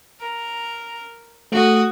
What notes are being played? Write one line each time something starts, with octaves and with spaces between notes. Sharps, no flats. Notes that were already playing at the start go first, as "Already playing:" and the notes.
A#4
A3 F#4 D#6